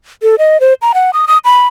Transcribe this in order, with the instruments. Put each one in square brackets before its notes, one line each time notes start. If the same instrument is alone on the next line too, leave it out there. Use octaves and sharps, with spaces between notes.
[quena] A4
D#5
C5
A#5
F#5
D#6
D#6
B5